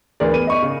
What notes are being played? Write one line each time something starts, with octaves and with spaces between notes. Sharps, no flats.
D2 E3 G#4 A#4 D5
B3 D#7
D#5 C#6
C#3